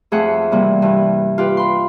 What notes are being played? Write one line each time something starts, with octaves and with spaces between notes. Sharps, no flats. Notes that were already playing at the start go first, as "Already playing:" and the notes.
F2 A3 G#4 C5 E5 F#5
C3 E3 G3 A#3
G2 E3
F4 G4 B4
B5 C6